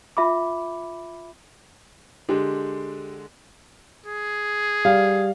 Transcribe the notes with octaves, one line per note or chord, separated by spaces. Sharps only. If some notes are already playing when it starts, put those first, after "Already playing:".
F4 E5 B5 D6
D3 G#3 G4
G#4
G3 F5